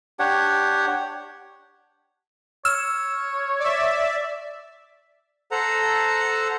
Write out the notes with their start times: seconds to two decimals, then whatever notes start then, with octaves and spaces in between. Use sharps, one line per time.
0.19 D4 G4 C#5 F#5
2.65 C#5 E6 F6 E7
3.60 D5 E5
5.51 A4 C5 F#5 A#5